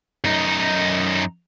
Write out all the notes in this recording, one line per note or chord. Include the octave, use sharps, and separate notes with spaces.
F#2 D#4